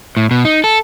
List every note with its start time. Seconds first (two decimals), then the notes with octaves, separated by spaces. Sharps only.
0.17 A2
0.31 B2
0.45 D#4
0.64 A4